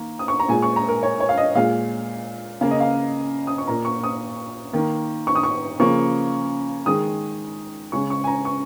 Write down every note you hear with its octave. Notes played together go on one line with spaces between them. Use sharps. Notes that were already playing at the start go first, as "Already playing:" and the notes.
Already playing: D#3 A#3
D#6
C#6
A#5
A#2 G#3 G#5
C#6
A#5
A#4
C#5
C#5
F5
D#5
A#2 G#3 F5
C#3 A#3 F5
D#5
F5
D#6
C#6
A#2 A#3 A#5
C#6
D#6
D#3 A#3
C#6
D#6
C#6
C#3 F3 A#3 C#6
D#3 G#3 D#6
C#3 G#3 C#6
C#6
G#5
A#5
C#6